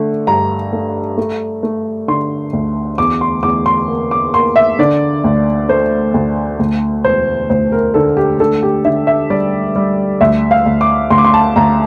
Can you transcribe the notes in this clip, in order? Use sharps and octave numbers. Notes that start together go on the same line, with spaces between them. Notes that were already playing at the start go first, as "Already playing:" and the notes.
Already playing: D3 A3
G2 A#5
A3
A3
A3
D3 C6
D2
E2 D6
C6
E2 D6
C6
A#3
D6
A#3 C6
E5
D3 D5
D2
A3 C5
D2
D2
E1 C5
D2 C5
A#4
D3 A4
G4
D3 A4
G4
D3 E5
E5
G3 D5
G3
D2 E5
F5
D2
D6
D2 C6
D6
C6
A5
D2 A#5